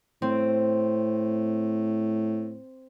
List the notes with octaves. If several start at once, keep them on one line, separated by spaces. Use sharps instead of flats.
A2 C4